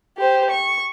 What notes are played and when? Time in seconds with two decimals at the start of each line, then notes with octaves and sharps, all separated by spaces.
0.18 G4 C5
0.49 C#6